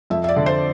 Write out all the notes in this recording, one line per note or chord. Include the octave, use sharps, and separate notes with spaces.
F2 E5
E5
D5
D3
C5